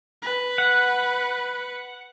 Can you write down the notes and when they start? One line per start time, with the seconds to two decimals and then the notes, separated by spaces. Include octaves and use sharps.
0.22 B4
0.58 F#5